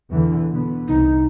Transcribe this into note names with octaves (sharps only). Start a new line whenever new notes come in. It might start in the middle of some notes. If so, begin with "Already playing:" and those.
E2 D3 E3
B2 D3 B3
C2 D#4